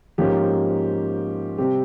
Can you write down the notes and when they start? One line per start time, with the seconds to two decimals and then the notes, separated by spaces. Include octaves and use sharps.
0.18 G#2 F3 A#3 C#4 G4
1.58 C3 G3 C4 G4